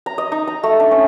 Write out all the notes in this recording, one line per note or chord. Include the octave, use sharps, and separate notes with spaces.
A#5
D#5
D#4
A#5
A3
D4
C#4